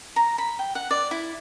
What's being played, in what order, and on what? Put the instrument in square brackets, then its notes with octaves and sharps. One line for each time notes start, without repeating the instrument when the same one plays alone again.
[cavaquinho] A#5
B5
G5
F#5
D5
E4